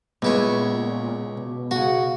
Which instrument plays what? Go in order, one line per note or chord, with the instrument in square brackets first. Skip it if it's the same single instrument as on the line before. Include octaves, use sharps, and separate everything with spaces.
[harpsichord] C#2 E4 C#5 [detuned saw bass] A#2 [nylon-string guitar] G#3 B3
[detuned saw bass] B2
[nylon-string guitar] C#3 F#5 [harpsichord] F#4